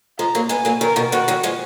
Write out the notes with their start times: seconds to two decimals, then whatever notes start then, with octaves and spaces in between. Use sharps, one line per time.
0.18 F3 G#3 A#5
0.35 F#3 A#3
0.49 G#3 B3 G#5
0.65 F#3 A#3
0.81 D#3 F#3 A#4
0.96 B2 D#3
1.12 B2 D#3 F#4
1.28 D#3 F#3
1.43 F3 G#3